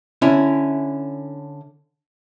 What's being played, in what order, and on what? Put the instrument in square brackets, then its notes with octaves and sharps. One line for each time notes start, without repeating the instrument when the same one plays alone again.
[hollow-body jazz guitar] D3 C#4 E4